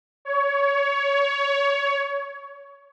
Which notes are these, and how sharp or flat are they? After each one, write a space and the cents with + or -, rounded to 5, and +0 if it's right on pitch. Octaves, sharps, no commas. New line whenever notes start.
C#5 +20